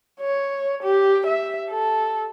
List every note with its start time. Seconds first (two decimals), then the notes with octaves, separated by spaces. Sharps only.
0.21 C#5
0.83 G4
1.27 E5
1.70 A4